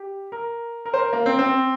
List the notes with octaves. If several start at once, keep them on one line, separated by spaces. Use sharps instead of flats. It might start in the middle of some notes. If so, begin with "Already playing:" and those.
Already playing: G4
A#4
A#4
C5
A#4
A#3
C4
C4